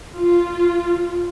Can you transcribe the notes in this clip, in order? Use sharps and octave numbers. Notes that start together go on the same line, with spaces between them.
F4